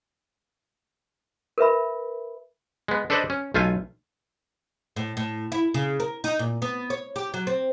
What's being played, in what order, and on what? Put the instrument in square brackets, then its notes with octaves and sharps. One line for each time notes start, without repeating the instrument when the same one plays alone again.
[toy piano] A#4 B4 E5 B5
[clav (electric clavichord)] G#3 B3
D4 A4 B4 C5 D5 D#5
C#4
B1 A3 F4 F5 G#5
[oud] A2
A2
E4
C#3
A#4
D#4
A#2
B3
C#5
G4
F#3
C4